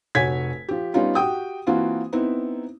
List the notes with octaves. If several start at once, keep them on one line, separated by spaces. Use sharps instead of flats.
F1 F#4 C#5 G#5 G#6 B6
F3 G4
G3 B3 C#4 D#4 F4
F#4 G4 G5 D#6
E3 A#3 C4 F4 F#4
B3 C4 D#4 E4